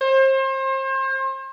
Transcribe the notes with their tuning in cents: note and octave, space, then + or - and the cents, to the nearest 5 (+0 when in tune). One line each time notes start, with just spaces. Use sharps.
C5 +35